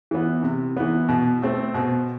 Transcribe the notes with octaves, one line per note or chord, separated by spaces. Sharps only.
E3 B3
C3
E3 B3
B2
A3 C4
B2